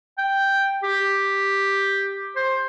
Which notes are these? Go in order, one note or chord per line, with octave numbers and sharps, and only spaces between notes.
G5
G4
C5